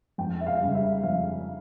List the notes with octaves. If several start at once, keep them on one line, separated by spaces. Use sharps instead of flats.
F2 G5
E5
F5
C#3 G3 C#4
E5
F2 F5